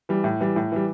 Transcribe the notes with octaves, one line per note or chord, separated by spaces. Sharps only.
E3 G3
A2
E3 G3
A2
E3 G3